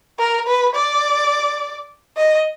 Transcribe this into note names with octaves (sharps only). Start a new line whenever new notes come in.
A#4
B4
D5
D#5